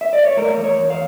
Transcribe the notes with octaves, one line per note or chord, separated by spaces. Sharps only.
E5
D5
C#5
A3 A#4
E2
C#5
E2
F5